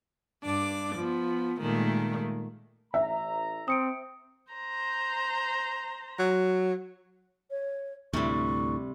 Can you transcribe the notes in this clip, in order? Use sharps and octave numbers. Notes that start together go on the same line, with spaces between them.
G2 D4 D6
F3 B3
A#2 D#3 G#3 A3
A1 E5 A#5
C4 D#6 C#7 D7
C5 A#5
F#3
C#5
D2 A2 C3 G3 C#6